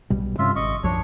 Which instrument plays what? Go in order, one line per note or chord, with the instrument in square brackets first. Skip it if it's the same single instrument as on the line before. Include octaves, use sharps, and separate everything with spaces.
[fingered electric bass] B1 B2 G3
[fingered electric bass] G2 C3 C#4 [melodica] F4 E5
[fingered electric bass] G#1 [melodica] D#5 C#6
[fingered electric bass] B1 F#2 F3 [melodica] D4 C#5